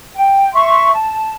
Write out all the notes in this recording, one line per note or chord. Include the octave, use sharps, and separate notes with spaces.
G5
E5 C6 C#6
A5